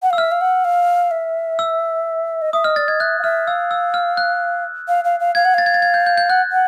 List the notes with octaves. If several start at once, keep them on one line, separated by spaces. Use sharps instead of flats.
F#5
F5 E6
E5 F6
F5
F#5
F5
E5
E6
D#5
E5 D#6
D#5 F6
D5 A6
D#5 G#6
E5 F#6
F5
E5 F6
F5 E6
E6
F6
F#6
F5
F5
F5
F5 G#6
F#5
F5 A6
G#6
A6
G#6
G6
G6
G6
F#5 F#6
F#5